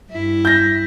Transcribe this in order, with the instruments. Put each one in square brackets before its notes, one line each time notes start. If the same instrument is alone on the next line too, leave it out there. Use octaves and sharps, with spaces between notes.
[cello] G2 E4
[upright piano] G6 A#6